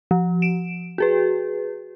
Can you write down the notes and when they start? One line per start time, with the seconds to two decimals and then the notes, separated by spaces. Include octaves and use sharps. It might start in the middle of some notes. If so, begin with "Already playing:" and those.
0.11 F3
0.42 D7 E7
0.98 F#4 G#4 B4